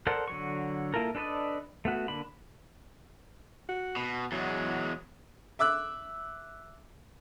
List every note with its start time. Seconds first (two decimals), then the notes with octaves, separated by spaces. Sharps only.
0.07 A4 A#4 C5 D5 F#5
0.28 D3 F#3 C#6
0.94 A#3 E4 F4 A4 A#4
1.15 D4 A4 B4 D5 D#5
1.85 A3 B3 F#4
2.08 D3 A#3 D4 B5
3.69 F#4
3.97 B2
4.32 E2 F#3 G#3
5.59 E5 D6 E6 F#6